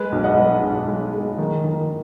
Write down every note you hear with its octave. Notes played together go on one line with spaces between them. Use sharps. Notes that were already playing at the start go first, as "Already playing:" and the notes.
Already playing: G#3 B4
B1
D#5 F#5
G#3
B1
G#3
G#3
D#3
D#3